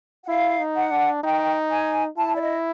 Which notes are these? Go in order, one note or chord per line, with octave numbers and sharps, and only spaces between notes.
F#5
E4 F5
D#4
F#5
D4
D#4 G5
G#5
E4 A5
D5
D#5